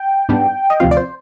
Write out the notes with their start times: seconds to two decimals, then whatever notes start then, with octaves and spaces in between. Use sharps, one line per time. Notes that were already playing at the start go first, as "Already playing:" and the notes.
Already playing: G5
0.29 G#2 G3 B3 D4
0.70 D#5
0.80 D2 C3 F3 C4 F4 F5
0.91 D5
0.97 C5